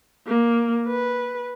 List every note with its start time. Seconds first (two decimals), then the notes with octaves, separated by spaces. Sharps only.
0.27 A#3
0.87 B4